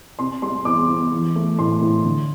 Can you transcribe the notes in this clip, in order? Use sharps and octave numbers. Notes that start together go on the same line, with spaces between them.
C3 C6
G3 C6
E2 D6
E2
E3
A3
A2 C6
A2
D3